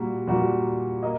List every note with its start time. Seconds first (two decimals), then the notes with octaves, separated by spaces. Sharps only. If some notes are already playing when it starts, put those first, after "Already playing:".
Already playing: A#2 G3 A#3 F#4
0.27 A#2 G3 A#3 F#4
1.03 A#3 D#5